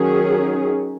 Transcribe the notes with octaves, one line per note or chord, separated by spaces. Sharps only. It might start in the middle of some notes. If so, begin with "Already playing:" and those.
Already playing: D#3 F#3 C#4 G#4